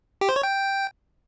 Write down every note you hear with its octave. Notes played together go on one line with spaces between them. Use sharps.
G4
C5
C#5
G5